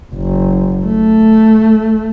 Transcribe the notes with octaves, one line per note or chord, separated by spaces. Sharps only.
F#1
A3